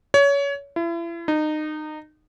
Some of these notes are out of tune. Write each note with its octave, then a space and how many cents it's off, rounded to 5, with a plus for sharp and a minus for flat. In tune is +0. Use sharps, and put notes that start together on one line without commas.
C#5 +25
E4 +35
D#4 -25